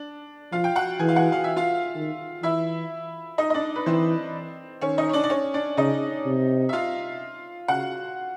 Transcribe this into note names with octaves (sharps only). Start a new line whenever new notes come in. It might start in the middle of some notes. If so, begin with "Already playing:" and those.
Already playing: D4
F3 F4 F5
G5
F#4 F#5
E3 G#4 G#5
F5
F#4 F#5
F5
E5
F4 F5
D#3
E3 E4 E5
D#4 D#5
D#5
D4 D5
B4
E3 C4 C5
D#3 C#4 C#5
D#4 D#5
C#5
D4 D5
D5
C#4 C#5
D4 D5
C#3 D#4 D#5
C3
E5
F4 F5
C#3 F#4 F#5